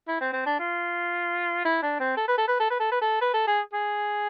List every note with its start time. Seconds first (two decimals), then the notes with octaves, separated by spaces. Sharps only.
0.08 E4
0.21 C4
0.33 C4
0.46 D4
0.59 F4
1.65 E4
1.82 D4
2.00 C4
2.17 A4
2.28 B4
2.38 A4
2.48 B4
2.60 A4
2.70 B4
2.80 A4
2.92 B4
3.01 A4
3.21 B4
3.34 A4
3.47 G#4
3.73 G#4